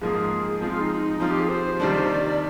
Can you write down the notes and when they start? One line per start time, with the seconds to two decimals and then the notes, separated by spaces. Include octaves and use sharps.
0.02 G#2 F3 A#3 F4 G#4
0.61 F3 G#3 C4 F4
0.71 F4
0.80 D#4
1.19 F3 C4 D#4 F4
1.30 G4
1.40 G#4
1.49 C5
1.80 C3 D#3 G3 A#3 D4
2.09 D5
2.26 D5